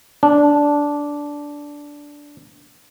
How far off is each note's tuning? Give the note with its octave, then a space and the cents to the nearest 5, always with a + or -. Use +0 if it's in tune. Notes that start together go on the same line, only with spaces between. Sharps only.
D4 -10